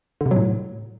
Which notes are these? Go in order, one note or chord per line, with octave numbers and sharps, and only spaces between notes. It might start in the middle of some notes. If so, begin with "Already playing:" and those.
D3
C3
F#3
A2